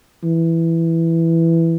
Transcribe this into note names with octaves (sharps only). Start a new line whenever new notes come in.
E3